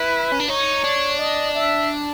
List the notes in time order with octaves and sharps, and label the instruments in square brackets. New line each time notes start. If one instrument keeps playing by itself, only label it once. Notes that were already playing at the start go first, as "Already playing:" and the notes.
Already playing: [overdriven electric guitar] E4 [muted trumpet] B4
[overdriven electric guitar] C#4
D4
[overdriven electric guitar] D#4 [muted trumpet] C#5
[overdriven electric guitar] D4
[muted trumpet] D#5
E5